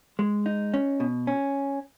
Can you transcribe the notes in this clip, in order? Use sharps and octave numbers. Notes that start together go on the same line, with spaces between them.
G#3
D#4
C#4
B2
C#4